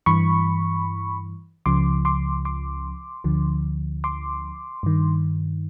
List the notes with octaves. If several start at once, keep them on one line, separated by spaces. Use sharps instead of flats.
G2 E3 B5 C#6
C#2 C#3 F3 C6 D6
C6 D6
C6 D6
D2 D3 F3
C6 D6
G2 D#3